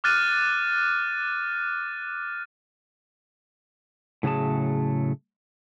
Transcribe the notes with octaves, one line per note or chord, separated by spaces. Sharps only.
D6 F6 F#6 A6 D#7
A2 C#3 F#3 A3 G#4 A5